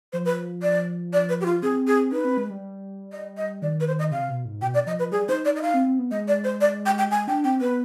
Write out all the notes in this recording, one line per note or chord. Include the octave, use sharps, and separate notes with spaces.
F3 C5
B4
D5
D5
B4
G4
F4
C4 G#4
G#4
D#4 B4
C4
G#3
G3
D#5
D#5
D#3 D5
B4
C5
D#5
C3 F5
B2
G#2
B2 G5
D5
F3 D#5
F3 B4
G3 G#4
D#4 C5
D#4 D5
D#5
D#4 F5
C4
C4
B3
G#3 D#5
D5
C5
D5
G5
G5
G#3 G#5
D4 G5
C4 G5
B3 B4